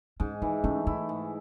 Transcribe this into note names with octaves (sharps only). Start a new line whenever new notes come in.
G#2 C#4
E3 D#4
A3 C#4
D#4 E4
G#2